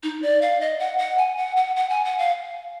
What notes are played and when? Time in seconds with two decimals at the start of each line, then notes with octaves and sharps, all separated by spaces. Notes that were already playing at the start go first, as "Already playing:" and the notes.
0.03 D#4
0.22 D5
0.42 F5
0.61 D#5
0.80 F#5
0.99 F#5
1.18 G#5
1.37 F#5
1.57 F#5
1.76 F#5
1.90 G#5
2.05 F#5
2.19 F5